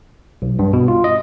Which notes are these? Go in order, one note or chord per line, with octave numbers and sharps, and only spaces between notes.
B1
G2
B2
F4
D#5